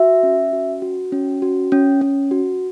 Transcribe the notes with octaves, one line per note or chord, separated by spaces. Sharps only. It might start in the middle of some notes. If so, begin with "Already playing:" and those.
Already playing: F#4 E5
C#4
F#4
F#4
C#4
F#4
C#4
C#4
F#4